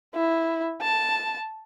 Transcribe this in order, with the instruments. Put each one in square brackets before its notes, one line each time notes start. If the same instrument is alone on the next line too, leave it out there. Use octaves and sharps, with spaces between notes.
[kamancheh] E4
A5